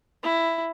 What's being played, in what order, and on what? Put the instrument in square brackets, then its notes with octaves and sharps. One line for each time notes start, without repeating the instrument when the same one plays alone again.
[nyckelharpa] E4